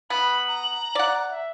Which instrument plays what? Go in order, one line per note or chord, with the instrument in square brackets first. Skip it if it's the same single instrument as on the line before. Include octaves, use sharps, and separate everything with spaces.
[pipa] B3 [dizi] B5 [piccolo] F#7
[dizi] A#5
[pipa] D5 F#5
[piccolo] E5